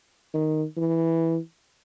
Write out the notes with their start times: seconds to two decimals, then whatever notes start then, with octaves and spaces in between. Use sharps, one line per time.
0.34 D#3
0.77 E3